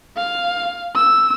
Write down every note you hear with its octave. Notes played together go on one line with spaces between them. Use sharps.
F5
E6